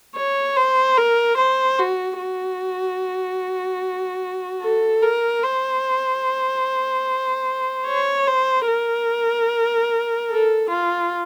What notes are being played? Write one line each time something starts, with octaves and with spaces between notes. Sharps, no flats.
C#5
C5
A#4
C5
F#4
F#4
A4
A#4
C5
C#5
C5
A#4
A4
F4